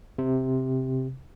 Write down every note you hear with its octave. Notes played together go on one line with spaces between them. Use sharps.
C3